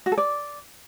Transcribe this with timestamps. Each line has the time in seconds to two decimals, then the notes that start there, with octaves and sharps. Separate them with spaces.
0.06 F#4
0.12 A4
0.18 D5